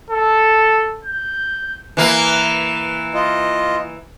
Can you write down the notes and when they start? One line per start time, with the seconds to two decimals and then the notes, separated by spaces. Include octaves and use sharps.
0.10 A4
1.05 G6
1.97 E3 A#3
3.14 F4 D#5